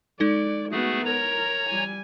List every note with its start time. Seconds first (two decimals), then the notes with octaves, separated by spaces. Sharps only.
0.20 G#3 D#4 A4 D5
0.71 A3 B3 F#4 G#4
1.05 A#4 C#5 A#5
1.70 G3 G#5